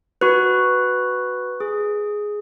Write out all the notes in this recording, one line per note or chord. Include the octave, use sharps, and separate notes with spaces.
F#4 B4
G#4